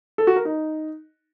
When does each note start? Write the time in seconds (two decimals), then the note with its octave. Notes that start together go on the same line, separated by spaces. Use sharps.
0.18 A4
0.27 F#4
0.36 A#4
0.45 D#4